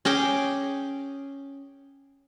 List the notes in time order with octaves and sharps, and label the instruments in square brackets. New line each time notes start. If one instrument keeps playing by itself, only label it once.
[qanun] C#4 G#4 G5 D6